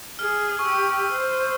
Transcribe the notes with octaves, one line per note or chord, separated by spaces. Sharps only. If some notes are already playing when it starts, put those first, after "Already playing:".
G#4 F6
C#6
G4 E6
C5